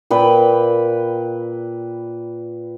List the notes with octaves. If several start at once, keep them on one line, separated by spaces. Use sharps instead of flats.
A#2 B4 G5